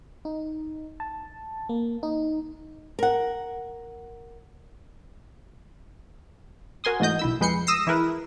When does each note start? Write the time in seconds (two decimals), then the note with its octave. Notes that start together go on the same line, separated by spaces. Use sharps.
0.25 D#4
1.00 A5
1.69 A#3
2.03 D#4
2.99 A#4 F#5
6.84 F#4 A#4 G#5 C6 D#6
7.00 G#2 E3 A3 F#4 D#5 G6
7.19 B1 E4 E6
7.41 F2 G#3 B4 G6 C7 C#7
7.67 D#6 E6 A#6 C7
7.87 E3 E4 G#4 A#4 B4